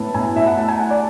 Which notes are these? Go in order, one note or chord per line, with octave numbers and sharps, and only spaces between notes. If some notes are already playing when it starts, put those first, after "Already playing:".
Already playing: A2 B3 A5
A2 G#5
A2 E5
F#5
A3 A5
G#5
A3 F#5
D5